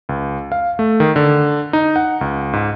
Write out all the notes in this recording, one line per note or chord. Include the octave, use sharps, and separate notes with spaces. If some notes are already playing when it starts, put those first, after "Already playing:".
C#2
F5
A3
D#3
D3
D#4
F#5
C#2
G#2